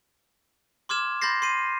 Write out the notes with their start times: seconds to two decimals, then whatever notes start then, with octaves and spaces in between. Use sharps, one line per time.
0.89 C6 D6 F6 G#6 E7
1.22 B5 C6 G6 A6 A#6 C7
1.42 C6 C7 D#7